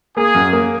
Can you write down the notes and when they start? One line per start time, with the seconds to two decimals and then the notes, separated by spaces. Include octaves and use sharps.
0.16 A#3 G#4
0.35 F#2
0.53 A#3